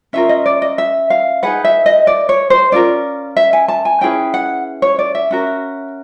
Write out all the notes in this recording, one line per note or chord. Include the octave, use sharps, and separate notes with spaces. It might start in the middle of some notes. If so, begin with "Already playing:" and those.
C#4 F4 A#4 E5
D#5
D5
D#5
E5
F5
D#4 G#4 B4 F#5
E5
D#5
D5
C#5
C5
C#4 F4 A#4 D5
E5
G#5
A5
G#5
C#4 E4 G#4 B4 G5
F#5
C#5
D5
E5
C#4 F#4 A#4